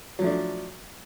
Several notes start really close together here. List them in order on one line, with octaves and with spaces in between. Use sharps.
F#3 F3 A3 D4